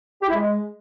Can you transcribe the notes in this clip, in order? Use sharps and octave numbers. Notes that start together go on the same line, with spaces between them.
G4
E4
G#3